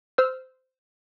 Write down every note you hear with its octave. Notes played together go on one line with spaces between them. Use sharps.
C5 E6 F6